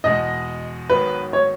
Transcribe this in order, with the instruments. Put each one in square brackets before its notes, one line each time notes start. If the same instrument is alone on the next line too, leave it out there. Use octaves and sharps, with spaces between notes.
[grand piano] E2 B2 G#3 [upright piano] D#5
[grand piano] G#2 D#3 F#3 B3 [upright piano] B4
[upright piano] C#5